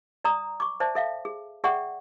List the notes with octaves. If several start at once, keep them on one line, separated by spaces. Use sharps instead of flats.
D5 A#5 D#6
C#6 D6
C5 D5 E5 A5
A4 E5 F5
G#4
G#4 D5 E5 F#5 G5 C#6